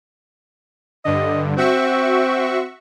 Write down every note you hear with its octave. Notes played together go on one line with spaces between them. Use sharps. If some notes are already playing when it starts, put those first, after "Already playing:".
G2 D3 D#5
C4 F#4 E5 C#6